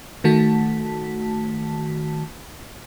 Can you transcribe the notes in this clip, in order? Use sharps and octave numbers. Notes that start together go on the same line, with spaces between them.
D#3 A3 F#4 A5 B6